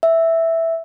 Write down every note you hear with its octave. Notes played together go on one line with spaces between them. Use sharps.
E5